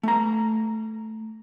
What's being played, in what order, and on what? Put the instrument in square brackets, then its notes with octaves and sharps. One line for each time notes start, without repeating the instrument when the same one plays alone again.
[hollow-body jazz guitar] A3 A#5